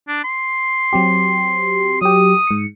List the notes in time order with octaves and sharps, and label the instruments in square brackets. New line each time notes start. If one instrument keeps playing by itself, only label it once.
[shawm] D4
C6
[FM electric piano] F#3 C4 G4
[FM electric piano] F#3 G4 [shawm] D#6
[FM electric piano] G#2 C#7